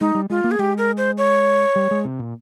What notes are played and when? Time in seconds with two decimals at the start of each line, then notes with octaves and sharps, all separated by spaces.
0.01 G#3 D#4
0.15 G3
0.30 G#3 F4
0.44 A#3
0.51 G#4
0.59 G#3 G4
0.78 A#4
0.98 C5
1.18 C#5
1.76 G3
1.91 G#3
2.05 C3
2.19 A#2